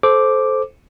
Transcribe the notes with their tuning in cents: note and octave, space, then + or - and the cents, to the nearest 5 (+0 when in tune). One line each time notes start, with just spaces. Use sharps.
A4 -20 C5 +0 D6 +0